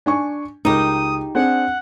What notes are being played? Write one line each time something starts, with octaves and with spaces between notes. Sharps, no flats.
D4 G#5 C#6
C#2 D#4 G4 A#4 D#6
C4 D4 G#4 F#5